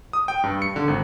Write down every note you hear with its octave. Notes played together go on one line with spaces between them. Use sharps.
D#6
G5
G2
C#7
D3
G#1